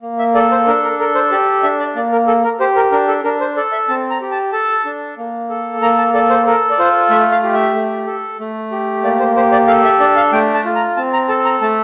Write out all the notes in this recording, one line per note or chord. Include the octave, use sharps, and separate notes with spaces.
A#3
E5
A4 D5
C5
D4 A#4
A#4
A4 A#4
C5
G4 D5
D4 E5
D5
A#3 D5
A#4
A4
A#4
G4 C5
A#4
D4 A#4
A4
D4 A#4
C5
A4 D5
E5
C4 A5
A#5
G4
A5
A4 A5
D4
A#3
A4
A#3 A#5
A5
A4 D5
C5
A4 A#4
D5
F4 C5
A3 E5
F5
G4
E5
A3
A4
A3
G4
A#3 D5
C5
G4 C5
D5
A4 F5
E5
D4 D5
F5
A3 G5
A5
F4
A#5
C4 A5
A#5
A4 A5
A#5
A3 A5